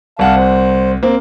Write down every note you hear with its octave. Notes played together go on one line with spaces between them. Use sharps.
C2 F5 F#5 A5
C5
A#3 C4